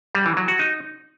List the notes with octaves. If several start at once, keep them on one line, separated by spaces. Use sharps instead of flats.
G3
E3
F#3
F#4
D#4